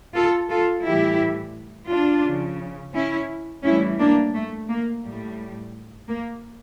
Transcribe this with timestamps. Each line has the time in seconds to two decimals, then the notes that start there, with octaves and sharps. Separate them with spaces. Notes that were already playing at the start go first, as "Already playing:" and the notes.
0.15 F4 A4
0.49 F4 A4
0.84 A2 E3 G3 E4 G4
1.89 D4 F4
2.24 C#3 F3
2.93 C#4 E4
3.63 A2 E3 G3 C#4 E4
3.99 A#3 D4
4.34 A3
4.69 A#3
5.04 A2 G3
6.08 A#3